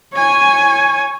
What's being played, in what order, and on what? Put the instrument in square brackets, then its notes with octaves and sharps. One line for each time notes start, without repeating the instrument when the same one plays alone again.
[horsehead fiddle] C#5 G#5